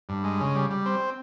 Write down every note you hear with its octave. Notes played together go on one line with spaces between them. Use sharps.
G2
G#3
C#3
G3
G3
C4